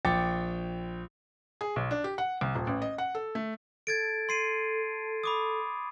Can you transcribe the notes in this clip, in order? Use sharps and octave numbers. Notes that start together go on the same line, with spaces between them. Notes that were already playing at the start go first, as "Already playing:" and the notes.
A#1 G5 D6 A6 C#7
G#4
B1
D4
G4
F#5
C2
D#1
A1
D#5
F#5
A4
A3
A4 G#6 A6 D7
C6 C7 D#7
B5 D6 D#6